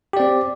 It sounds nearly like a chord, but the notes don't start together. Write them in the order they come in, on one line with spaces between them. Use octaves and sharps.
G4 D5 C4